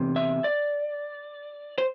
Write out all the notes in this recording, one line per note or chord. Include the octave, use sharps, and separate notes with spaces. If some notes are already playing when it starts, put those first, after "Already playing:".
Already playing: E2 C3
E5
D5
C5